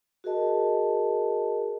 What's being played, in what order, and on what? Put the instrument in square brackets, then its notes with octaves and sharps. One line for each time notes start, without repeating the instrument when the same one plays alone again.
[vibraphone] F#4 G#4 A#4 D#5 A5